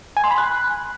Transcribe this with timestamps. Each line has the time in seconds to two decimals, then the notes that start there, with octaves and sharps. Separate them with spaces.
0.17 G#5
0.24 C6
0.31 B5
0.38 F#6